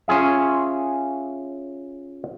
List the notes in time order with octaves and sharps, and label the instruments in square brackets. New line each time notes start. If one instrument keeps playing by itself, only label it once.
[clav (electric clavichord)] C#4 F4 G#4 E5